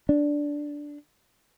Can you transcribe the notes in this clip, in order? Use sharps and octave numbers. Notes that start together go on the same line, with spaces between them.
D4